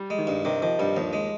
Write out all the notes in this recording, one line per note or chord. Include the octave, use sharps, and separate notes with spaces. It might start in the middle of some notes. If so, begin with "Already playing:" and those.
Already playing: G3
G#3
D#3
G2
C3 D#3
D#3 F3
G2 G3
D#2 F3
G#3